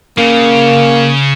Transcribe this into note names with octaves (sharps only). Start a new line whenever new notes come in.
C#3 A#3